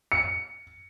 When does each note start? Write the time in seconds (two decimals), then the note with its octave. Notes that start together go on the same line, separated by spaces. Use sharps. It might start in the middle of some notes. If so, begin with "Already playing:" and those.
0.12 C#7